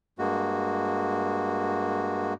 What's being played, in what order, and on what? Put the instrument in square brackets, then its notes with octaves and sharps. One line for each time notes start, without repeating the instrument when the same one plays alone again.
[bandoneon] G2 G#3 A#3 F#4